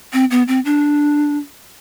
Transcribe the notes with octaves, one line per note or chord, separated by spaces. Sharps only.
C4
B3
C4
D4